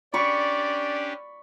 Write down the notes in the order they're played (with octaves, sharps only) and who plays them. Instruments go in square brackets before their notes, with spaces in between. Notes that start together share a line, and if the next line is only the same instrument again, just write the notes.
[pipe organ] C#4 D4 G4 [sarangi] D5 [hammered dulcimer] B5 C#6